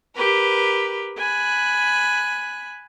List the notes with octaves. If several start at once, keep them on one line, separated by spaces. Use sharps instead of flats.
G4 A#4 B4
G#5 B5 F#6